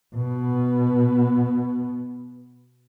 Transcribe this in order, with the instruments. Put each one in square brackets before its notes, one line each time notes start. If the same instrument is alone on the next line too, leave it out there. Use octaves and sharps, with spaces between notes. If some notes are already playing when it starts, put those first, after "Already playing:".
[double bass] B2 B3